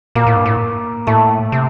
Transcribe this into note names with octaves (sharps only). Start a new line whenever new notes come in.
A#2 A#3
A2
G2
A2
A2 A3
C3